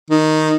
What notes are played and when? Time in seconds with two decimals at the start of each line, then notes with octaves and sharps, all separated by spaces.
0.11 D#3